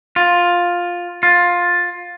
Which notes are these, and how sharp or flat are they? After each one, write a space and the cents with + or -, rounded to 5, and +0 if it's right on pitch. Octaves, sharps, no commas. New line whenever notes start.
F4 +10
F4 +15